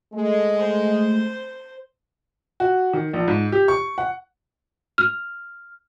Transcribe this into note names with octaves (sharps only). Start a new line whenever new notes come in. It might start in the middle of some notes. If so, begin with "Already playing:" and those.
G#3 A3
C5
F#4
D#3
A#1
G#2
G4
C#6
F#5
F6